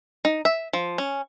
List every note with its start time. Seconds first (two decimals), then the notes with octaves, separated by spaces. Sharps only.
0.25 D#4
0.45 E5
0.73 F3
0.98 C#4